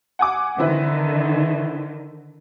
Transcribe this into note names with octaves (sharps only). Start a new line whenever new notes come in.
F#5 G#5 D6
D3 D#3 C4 E4 B4